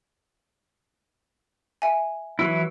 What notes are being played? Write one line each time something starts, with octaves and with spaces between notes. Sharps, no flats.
E5 G#5
E3 F#3 E4